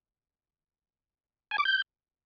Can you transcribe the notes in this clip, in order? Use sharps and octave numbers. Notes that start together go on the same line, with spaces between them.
G#5
D6
G6